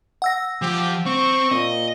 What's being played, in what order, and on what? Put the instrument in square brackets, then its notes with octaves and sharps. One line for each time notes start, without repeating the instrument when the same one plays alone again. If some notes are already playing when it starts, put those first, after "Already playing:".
[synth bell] F#5 E6 A#6
[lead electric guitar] F3 [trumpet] G4
[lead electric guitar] C4 [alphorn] C5 [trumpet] C#6
[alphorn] A#2 [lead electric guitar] D#5